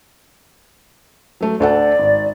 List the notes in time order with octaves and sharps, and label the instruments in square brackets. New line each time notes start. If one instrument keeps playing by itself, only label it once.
[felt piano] F#3 A3
[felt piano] D2 A4 F#5 [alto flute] D5
[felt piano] G#1